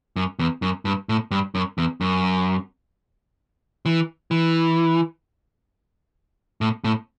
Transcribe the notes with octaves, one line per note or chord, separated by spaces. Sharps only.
F#2
E2
F#2
G2
A2
G2
F#2
E2
F#2
E3
E3
A2
A2